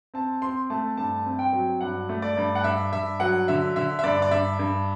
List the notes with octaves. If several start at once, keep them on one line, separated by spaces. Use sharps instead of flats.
C4 A5
C4 C6
A3 A5
G2 A5
C4
G5
F#3
G2 F#5
A3
D5
G2
F#5
G2 E5
G2 E5
F#3 F#5
D3 E5
D3 E5
E5
G2 D5
D5
G2 E5
G2